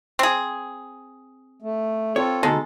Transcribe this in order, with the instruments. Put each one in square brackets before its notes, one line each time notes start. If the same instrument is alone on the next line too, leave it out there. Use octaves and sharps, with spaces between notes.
[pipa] C4 G#4
[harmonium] A3
[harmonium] C4 F4 A4 [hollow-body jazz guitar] C#5
[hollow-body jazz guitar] D2 B2 A4 [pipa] G#3 [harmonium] D#4